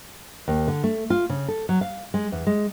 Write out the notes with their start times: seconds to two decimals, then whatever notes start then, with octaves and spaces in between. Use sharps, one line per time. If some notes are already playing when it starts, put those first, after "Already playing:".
0.48 D#2
0.68 D3
0.84 A3
1.10 F4
1.29 C#3
1.48 A4
1.69 F#3
1.81 F5
2.14 G#3
2.32 E2
2.47 G#3